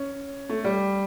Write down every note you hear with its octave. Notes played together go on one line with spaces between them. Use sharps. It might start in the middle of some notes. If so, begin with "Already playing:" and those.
Already playing: C#4
A3
G3